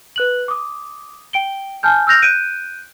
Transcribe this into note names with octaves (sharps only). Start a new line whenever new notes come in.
B4 F#6 F#7
D6 D#6
G5 D7 G7
G#5 A5 F6 G6
E6 F6 G6 A#6 F7
F#6 G6 D7 D#7